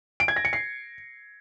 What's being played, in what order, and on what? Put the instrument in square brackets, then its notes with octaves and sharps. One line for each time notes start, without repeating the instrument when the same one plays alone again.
[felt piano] D7
G#6
A#6
C#7
C7